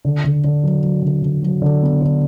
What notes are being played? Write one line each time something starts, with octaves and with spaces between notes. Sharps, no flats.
D3
D3
D3
F#3
F#3
D3
D3
F#3
D3
B3
D3